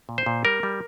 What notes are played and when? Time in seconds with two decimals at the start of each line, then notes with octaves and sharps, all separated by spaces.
0.09 A#2
0.18 C5
0.26 A#2
0.45 G3 A#4
0.63 G3